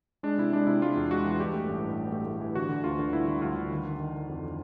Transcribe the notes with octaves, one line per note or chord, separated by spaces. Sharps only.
G#3 D4
C3 E4
G#3 D4
C3 E4
G#3 F4
E2
G#3 F#4
E3
G2 G4
A3
A1
G2
A1
A3
A3
E3
D3 F#4
D3
D2 F4
D3
G3 E4
D3
D2 F4
D3
D#3
D#3
D#3
D#3
F2